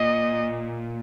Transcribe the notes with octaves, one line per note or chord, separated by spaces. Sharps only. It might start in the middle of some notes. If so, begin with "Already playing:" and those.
Already playing: A#2 D#5